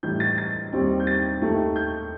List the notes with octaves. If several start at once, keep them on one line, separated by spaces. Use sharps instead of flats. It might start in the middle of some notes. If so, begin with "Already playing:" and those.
A2 E3 G3 D#4 G6
A6
A6
D#2 D#3 G3 C4
G6
A6
D#2 D#3 A3
G6